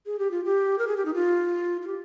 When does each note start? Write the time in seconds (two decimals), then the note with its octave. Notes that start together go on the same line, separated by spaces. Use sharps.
0.06 G#4
0.19 G4
0.31 F4
0.45 G4
0.78 A#4
0.87 G#4
0.97 G4
1.05 D#4
1.14 F4
1.82 F4
1.87 G4